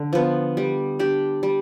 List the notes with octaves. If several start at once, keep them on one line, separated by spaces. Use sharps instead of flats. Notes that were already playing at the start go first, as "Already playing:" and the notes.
Already playing: D3
F3 B3
G3
D4 G4
G3